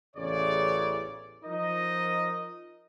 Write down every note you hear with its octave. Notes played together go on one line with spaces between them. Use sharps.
A1 E2 C#3 C#5 D5
F3 D#4 A#4 D#5